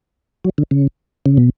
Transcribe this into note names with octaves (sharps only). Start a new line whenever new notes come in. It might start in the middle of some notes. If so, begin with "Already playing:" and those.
F#3
D3
C#3
C#3
B2